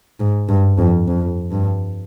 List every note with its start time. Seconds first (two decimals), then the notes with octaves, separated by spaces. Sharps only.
0.20 G#2
0.49 G2
0.79 F2
1.08 F2
1.51 G2